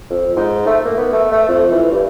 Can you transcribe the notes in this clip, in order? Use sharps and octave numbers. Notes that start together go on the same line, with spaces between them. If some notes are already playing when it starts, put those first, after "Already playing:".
F2
G#2
A3
A#3
B3
A3
A3
F2
E3
G2